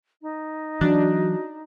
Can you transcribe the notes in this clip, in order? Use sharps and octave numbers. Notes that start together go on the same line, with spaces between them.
D#4
E3 F#3 D4 F#4